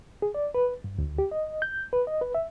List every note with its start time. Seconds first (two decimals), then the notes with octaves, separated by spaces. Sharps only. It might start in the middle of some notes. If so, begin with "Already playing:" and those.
0.22 G#4
0.35 D5
0.55 B4
0.84 G2
0.98 D2
1.19 G4
1.31 D#5
1.62 G6
1.93 B4
2.07 D#5
2.21 B4
2.35 E5